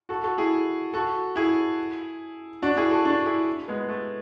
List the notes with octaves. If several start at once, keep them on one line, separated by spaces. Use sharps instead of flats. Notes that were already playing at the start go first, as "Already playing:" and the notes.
F#4 A4
F#4 A4
E4 G#4
F#4 A4
E4 G#4
D4 F#4
E4 G#4
F#4 A4
D4 F#4
E4 G#4
G#3 B3
A3